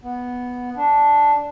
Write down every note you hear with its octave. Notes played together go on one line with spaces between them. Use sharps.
B3
D4